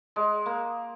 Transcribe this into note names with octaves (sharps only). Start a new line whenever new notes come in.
G#3
A#3